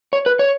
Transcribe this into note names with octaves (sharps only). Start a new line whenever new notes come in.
C#5
B4
C#5